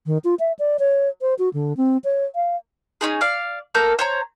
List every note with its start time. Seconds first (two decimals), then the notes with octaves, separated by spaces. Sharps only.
0.06 D#3
0.24 F4
0.40 E5
0.59 D5
0.79 C#5
1.21 C5
1.39 F#4
1.54 D3
1.77 C4
2.04 C#5
2.35 F5
3.01 C#4 D#4 G#4
3.21 D5 F5
3.74 A#3 A4 A#4 G6
3.99 C5 C#5 A#5